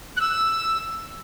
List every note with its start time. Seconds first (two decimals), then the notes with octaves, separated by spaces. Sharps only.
0.16 F#6
0.20 E6